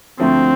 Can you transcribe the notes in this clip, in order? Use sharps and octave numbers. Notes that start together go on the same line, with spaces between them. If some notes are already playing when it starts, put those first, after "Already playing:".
D2 D3 F3 A3 C4